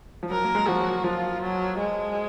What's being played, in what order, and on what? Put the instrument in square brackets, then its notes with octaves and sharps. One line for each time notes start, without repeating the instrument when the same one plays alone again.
[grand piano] F3
[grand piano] F#3 [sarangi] A#4
[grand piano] A#3
G#3
[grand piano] F3 [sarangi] F#4
[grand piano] F#3
[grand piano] F3 [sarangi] F4
[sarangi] F#3
G#3